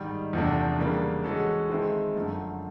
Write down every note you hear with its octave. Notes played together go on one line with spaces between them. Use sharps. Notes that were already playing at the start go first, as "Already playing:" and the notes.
Already playing: G#2 D#3 G3
E2 C3 F3 A3 D4
C#3 E3 G3 A#3 D4
E3 G#3 C#4 F#4 A4
D#3 G#3 C4 E4 A4
F#2 D3 F3 A3